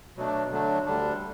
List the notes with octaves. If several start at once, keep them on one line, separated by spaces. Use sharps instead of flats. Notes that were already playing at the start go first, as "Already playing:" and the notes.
B2 F#3 A3 D4
D3 F#3 A3 D4
D2 D3 G3 D4